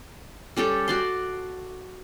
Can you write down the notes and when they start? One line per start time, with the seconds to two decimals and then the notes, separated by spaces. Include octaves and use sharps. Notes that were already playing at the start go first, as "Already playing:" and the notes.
0.57 G3 C#4 G4 A4
0.88 F#4 D5 C6